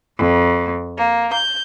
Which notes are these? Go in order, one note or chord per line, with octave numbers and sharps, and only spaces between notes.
F2
A#3
G6